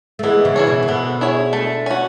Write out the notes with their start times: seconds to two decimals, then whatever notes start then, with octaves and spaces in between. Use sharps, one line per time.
0.19 A3
0.23 E3 G#3 B3
0.45 C#3 E3
0.56 E4 G#4 C#5
0.67 B2
0.83 E3
0.88 B2 D3 B3
1.21 E4 G#4 C#5
1.53 A3
1.86 C#4 F#4